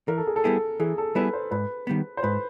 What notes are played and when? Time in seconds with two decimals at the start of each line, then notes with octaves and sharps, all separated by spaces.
0.08 E3 A#4
0.17 A4
0.27 G#4
0.36 A4
0.44 G3 B3 E4 G#4
0.80 E3 G#4
0.98 A4
1.15 G3 B3 E4 G#4 B4
1.33 C5
1.51 G#2 B4
1.87 D#3 G3 B3
2.17 C5
2.23 G#2 B4